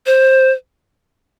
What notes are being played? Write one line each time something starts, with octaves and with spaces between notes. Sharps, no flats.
C5